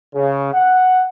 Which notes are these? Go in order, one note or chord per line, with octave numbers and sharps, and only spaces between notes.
C#3
F#5